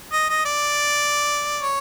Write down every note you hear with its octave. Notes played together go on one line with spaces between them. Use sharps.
D#5
D#5
D5
C#5